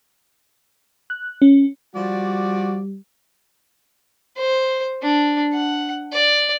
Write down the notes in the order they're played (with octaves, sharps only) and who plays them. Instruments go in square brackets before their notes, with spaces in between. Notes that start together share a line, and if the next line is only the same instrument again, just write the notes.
[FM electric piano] F#6
C#4
[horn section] F3 F#4 D5 [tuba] G3
[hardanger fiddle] C5
D4
F#5
D5